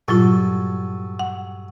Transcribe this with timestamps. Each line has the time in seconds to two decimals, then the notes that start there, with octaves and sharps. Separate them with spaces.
0.08 G2 A#2 F#3 F4 F#4 A4
1.19 F#5